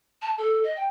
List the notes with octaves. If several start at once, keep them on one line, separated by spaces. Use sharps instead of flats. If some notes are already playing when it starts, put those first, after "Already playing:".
A5
A4
D#5
G5